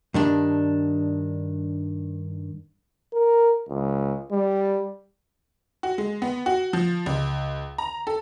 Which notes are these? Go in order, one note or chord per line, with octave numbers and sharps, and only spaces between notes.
G2 D#3 D4
A#4
C#2
G3
F#4
G#3
B3
F#4
F3
C#2
A#5
A4